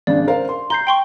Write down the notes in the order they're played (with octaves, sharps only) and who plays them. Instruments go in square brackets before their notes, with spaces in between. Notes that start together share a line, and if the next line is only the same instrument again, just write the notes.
[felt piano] G#1 C#3 D4 [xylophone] D5
[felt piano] A#4 C5 F5
C6
[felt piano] A#5 [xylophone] C6 G6 C7
[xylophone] G5 C6 C#6